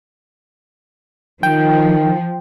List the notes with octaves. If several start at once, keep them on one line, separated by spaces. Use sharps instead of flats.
D#3 F3 G5